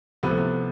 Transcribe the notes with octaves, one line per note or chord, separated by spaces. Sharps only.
C2 C3 F3 B3
A3
B3